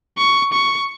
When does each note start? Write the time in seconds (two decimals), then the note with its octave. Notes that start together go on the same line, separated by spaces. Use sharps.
0.18 C#6
0.53 C#6